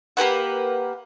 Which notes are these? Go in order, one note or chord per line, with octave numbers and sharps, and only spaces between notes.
A#3 G4 B4 F#5